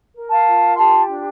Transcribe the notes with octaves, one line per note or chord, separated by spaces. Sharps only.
A#4
F5 A5
F4
G4 A5 C6
D4